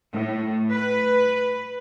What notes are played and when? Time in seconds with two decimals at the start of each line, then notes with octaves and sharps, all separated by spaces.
0.12 A2
0.70 B4